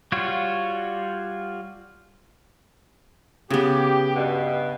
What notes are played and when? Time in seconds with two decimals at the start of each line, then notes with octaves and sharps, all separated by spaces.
0.12 G3 F4 F#4 C#5
3.50 C#3 B3 G4
4.15 G2 B2